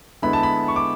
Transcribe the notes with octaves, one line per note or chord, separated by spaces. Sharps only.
D3 G#3 B3 E4 B5
A5
B5
C#6
D6